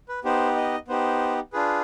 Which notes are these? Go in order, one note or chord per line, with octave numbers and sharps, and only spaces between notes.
B4
B3 D#4 G4 C5
D#5
B3 D#4 G4 C5
D4 F4 G#4 B4